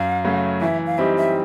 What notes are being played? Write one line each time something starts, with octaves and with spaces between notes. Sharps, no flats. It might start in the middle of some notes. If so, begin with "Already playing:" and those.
Already playing: F#2 F5
C#3 F#3 A3
E3 E5
F5
G3 C4 D#4 G4 E5
E5